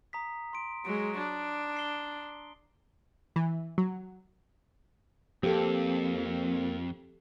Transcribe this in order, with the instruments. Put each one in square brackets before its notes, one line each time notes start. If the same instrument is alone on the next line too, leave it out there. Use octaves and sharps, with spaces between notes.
[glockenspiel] A#5 D#6 B6
C6 D7
[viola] F#3 G#3 [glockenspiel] D7
[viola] D4
[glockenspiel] C7 G7
[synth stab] E3
F#3
[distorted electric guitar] F2 [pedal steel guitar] A#3 C4 [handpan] G4 A4